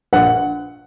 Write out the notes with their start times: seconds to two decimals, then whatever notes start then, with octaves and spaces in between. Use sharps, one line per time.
0.13 A#1 F#5